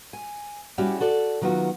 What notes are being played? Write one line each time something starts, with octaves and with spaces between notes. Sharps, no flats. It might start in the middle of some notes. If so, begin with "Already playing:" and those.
G#5
G3 C#4 E4 F#4 G4 D5
F#4 A4 D5
D#3 F#3 B3 F4 F#4